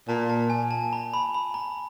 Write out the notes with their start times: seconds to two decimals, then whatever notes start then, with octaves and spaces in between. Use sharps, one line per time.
0.08 A#2 A5
0.30 A5
0.50 G#5
0.71 A5
0.93 A#5
1.14 B5
1.34 B5
1.54 A#5